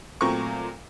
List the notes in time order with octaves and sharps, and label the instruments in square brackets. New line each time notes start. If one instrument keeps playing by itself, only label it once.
[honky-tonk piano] A#2 F#3 A3 C4 C#6